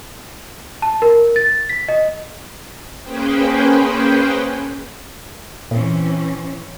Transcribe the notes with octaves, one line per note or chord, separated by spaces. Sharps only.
A5
A#4
A6
B6
D#5
A#3 C#4 G#4 B4 C5 G5
A#2 E3 C4 C#4